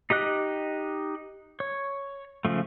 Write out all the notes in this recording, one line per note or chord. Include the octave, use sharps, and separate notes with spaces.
D#4 G4 D#5 F#6
C#5
C#3 F3 A3